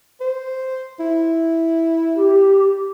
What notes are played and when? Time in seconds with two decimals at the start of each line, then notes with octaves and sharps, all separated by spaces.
0.21 C5
1.00 E4
2.16 G4